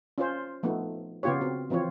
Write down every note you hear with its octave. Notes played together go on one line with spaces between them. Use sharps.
C#4 F4 C5
F3 A3 B3 D#4
C#3 B3 F4 G4 C#5
C#3 C4 F#4
E3 F3 C4 F4 C#5